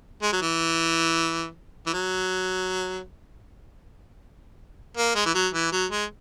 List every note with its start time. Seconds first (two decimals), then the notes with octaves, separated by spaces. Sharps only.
0.22 G#3
0.32 F#3
0.41 E3
1.87 E3
1.93 F#3
4.97 A#3
5.15 G#3
5.26 E3
5.34 F#3
5.54 E3
5.72 F#3
5.91 G#3